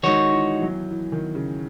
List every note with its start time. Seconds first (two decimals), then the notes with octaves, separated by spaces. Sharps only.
0.03 D#3 G#3 D#4 F#4 C#5
0.32 E3
0.54 E3
0.62 F#3
0.91 E3
1.12 D#3
1.35 C#3